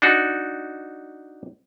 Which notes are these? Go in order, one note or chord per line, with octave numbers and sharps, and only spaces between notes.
D4 D#4 F#4